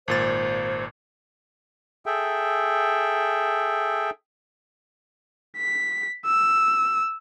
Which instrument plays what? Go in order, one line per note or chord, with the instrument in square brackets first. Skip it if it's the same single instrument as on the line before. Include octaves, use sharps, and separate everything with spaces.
[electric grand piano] G#1 A#2 A6 [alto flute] C5
[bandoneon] G#4 A4 E5 G5
[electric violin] B6
E6